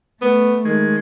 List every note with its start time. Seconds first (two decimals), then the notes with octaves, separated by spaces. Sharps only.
0.22 A3 B3
0.65 D#3 G#3